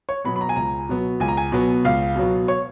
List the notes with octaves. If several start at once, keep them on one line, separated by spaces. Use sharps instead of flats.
C#5
B2 F#3 B3 B5
B5
A#5
G#5
C#2 A#5
B2 F#3 B3
C#2 G#5
A#5
G#5
B2 F#3 B3
C#2 F5
B2 F#3 B3
C#5